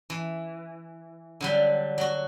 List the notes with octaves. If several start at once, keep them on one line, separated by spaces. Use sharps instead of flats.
E3
D3 F#3 G3
F#3 F#4